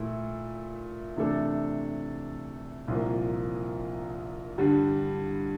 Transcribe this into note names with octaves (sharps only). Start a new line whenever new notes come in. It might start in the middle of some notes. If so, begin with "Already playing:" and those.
Already playing: A#2 A3 E4
C3 E3 A3 D4 A4
C2 A#2 F3 A#3
G2 D3 G3